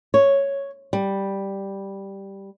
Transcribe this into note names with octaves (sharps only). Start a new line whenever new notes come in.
C#5
G3